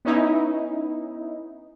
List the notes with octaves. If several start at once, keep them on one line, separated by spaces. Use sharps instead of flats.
B3 C#4 D#4 E4